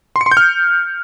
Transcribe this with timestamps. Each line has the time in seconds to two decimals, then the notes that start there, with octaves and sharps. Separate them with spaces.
0.16 C6
0.21 C#7
0.26 C6
0.32 G6
0.37 F6